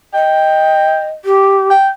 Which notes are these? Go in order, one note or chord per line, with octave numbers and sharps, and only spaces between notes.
D#5 G5
G4
G5